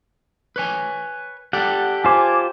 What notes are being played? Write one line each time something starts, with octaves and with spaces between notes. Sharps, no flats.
B4 C#5 G#5
G4 A4 D5 F#5
F4 C5 G#5 D6